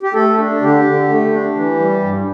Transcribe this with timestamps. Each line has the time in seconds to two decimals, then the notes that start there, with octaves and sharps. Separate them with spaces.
0.03 G4
0.14 A3 A4
0.38 D4
0.61 D3 G4
0.85 D3
1.09 A3
1.32 D4
1.55 E3
1.79 G3
2.03 G2